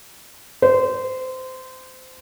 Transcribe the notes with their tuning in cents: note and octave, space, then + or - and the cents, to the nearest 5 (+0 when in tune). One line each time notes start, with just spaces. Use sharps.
C5 -20